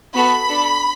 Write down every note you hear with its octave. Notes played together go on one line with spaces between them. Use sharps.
B3 F#4 A4 B5
D4 A4